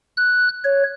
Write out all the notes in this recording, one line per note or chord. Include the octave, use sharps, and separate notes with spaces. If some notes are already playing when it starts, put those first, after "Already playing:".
F#6
C#5